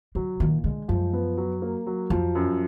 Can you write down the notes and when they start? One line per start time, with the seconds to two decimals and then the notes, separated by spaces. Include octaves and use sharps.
0.15 D3 F#3
0.40 A#2 D#3
0.64 D3 G#3
0.88 F#2 F3
1.13 B3
1.37 F#3
1.62 A#3
1.86 F#3
2.10 F2 F3
2.35 F#2